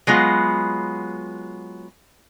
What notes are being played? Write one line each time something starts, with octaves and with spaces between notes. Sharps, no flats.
F#3 G#3 B3 F4